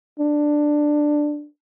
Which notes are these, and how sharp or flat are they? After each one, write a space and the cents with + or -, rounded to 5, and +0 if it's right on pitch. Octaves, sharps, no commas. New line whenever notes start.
D4 +10